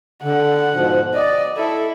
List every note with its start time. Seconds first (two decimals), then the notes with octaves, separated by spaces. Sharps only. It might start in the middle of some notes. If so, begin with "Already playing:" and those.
0.23 D3 F#5
0.74 G#2 B2 F3
1.14 D5 D#5
1.57 E4 A4